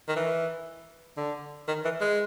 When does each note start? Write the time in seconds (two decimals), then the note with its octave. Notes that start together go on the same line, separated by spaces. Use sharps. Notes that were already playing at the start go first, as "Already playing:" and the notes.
0.08 D#3
0.16 E3
1.17 D3
1.68 D#3
1.85 E3
2.01 G#3